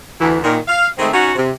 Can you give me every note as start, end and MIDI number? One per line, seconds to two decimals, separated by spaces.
0.20 0.36 38
0.20 0.36 52
0.43 0.58 46
0.43 0.58 51
0.68 0.87 77
0.98 1.09 51
0.98 1.09 56
0.98 1.09 57
0.98 1.09 60
1.13 1.31 61
1.13 1.31 63
1.13 1.31 66
1.35 1.50 48